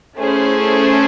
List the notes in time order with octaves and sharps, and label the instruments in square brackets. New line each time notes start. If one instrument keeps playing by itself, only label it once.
[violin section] A3 C#4 E4 G#4 C5